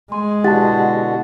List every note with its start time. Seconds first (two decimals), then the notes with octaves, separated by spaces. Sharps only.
0.12 G#3 G#5 C6
0.44 B2 D3 E4 F#4 G4 F#5 A5 A6